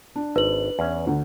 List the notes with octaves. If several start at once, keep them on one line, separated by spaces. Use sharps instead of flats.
D4
G#1 B4 F#7
E2 C#4
D2